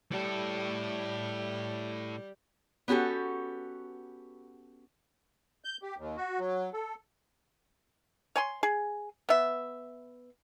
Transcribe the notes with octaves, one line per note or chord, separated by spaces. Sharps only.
A2 G3 A4
B3 C#4 F#4 G4 A4
G6
G4
D#2
F#4
F#3
A4
C#5 G#5 C6
G#4
B3 E5